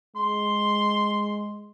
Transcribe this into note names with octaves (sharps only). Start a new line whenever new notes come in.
G#3 C6